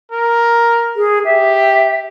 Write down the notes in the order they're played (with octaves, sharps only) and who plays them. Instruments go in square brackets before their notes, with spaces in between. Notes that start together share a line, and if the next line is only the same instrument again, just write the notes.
[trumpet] A#4
[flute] G#4
[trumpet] G4 [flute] E5